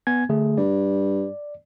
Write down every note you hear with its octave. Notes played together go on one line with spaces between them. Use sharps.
B3 G#5 G#6
D3 A3 G#4
G2 D5